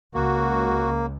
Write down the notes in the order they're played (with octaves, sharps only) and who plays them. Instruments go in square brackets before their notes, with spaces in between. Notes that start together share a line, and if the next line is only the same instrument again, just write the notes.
[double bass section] C#2 [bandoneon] A#3 [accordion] F#4